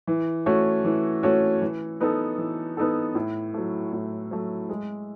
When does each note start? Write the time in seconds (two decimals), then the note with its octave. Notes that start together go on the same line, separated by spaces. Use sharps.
0.07 E3
0.46 A3 C#4 F#4 C#5
0.85 E3
1.23 A3 C#4 F#4 C#5
1.62 E3
2.00 B3 D#4 A4
2.38 E3
2.77 B3 D#4 A4
3.15 A2
3.54 F#3 A3
3.93 A2
4.31 F#3 A3
4.69 G#3